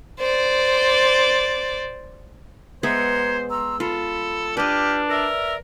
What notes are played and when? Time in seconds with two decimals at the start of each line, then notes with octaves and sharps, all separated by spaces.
0.20 C5 D5
2.83 G#3 B3 C5 E5 F#5 A#5 G#6
3.50 A#5 C6 E6
3.80 F4 A4 B5
4.57 D4 G4 B4 D#5 F6
5.09 A#4 D5 E5 E6